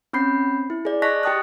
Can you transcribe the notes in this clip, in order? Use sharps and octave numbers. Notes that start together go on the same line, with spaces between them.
C4 C#4 B5 G6 C7
E4
G#4 D5
D#5 A5 C#6 F#6 A#6 B6
G4 G5 A5 D#6 F#6